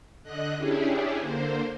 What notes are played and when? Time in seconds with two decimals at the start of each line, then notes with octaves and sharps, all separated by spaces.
0.23 D3 D#5 F#6
0.57 C#4 D4 E4 G4 G#4
1.20 D3 A#3 C5